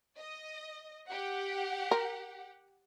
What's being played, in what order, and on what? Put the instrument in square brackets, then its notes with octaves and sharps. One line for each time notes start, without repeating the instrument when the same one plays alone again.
[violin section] D#5
G4 F#5
[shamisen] A#4